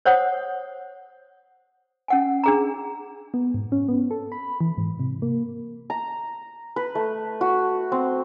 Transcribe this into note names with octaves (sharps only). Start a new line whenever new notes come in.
C5 C#5 F#5 D#6
C#4 F#5 G#5
D4 G#4 A#5
B3
G#2
C#4
B3
A4
B5
E3
G#2
C3
A#3
A#5
B4
A3
F#4
C4